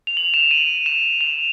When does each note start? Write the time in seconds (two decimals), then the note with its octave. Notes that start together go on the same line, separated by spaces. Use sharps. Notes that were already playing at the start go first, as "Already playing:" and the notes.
0.07 F7
0.17 F#7
0.34 E7
0.51 D#7
0.86 E7
1.21 F7